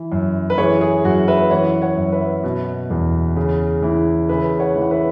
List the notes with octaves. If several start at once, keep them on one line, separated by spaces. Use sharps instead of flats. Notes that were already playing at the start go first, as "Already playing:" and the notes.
Already playing: E3
F#2
B4
E3 G#4 C#5
G#4
F#2 F#4
B4 E5
E3 C#5 F#5
C#5 F#5
F#2
B4 E5
B2
E2
C#3
E3
C#3 B4 E5
C#5 F#5
E3
F#5
B4 E5